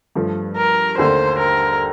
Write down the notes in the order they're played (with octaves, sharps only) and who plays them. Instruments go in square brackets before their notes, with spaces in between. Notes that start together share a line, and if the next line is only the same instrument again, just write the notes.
[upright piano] G2 F3 A3
[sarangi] A#4
[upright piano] D#2 D3 A3 [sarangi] C5
[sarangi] A#4